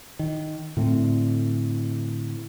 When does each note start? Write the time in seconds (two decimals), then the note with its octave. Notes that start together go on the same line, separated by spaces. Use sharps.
0.19 D#3
0.77 A2 D3 A3 C4